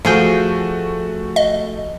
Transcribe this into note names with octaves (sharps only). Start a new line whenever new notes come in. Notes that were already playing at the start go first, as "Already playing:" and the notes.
F3 A3 F#4 G#4 G5
D#5